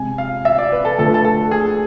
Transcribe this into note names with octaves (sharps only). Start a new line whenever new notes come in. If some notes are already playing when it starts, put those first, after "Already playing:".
Already playing: C3 G#3 G#5
F5
E5
D5
B4
A4
D3 F3 A3 A4
B4
A4
A4
G#4